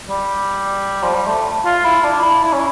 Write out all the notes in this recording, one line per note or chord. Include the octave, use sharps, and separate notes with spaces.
G3
F3
G3
A3
F4
E4
D4
E4
E4
C#4